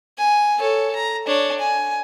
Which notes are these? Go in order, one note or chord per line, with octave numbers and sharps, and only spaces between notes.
G#5
A4 C#5
A#5
D4 C#5
G#5